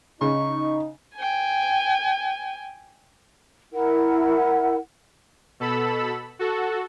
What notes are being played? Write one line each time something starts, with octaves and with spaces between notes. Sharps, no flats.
C#3 D#4 C#6
G5 G#5
E4 A#4 F#5
B2 A4 B5 E6
F#4 A4